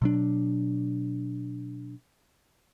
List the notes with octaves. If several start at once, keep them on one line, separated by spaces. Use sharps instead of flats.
B2 F#3 D4